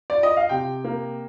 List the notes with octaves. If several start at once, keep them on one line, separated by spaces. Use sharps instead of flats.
D5
D#5
F5
C3 G5
A#3